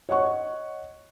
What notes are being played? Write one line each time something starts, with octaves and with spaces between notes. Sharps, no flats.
C#5 D#5 F#5 C#6